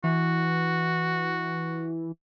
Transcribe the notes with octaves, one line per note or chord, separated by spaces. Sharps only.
E3 F#4